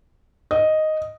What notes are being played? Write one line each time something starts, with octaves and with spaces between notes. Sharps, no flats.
D#5